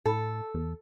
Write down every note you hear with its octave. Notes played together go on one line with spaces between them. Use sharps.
A2 A4
E2